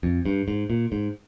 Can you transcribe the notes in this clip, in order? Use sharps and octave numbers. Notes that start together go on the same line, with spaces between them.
F2
G2
G#2
A#2
G#2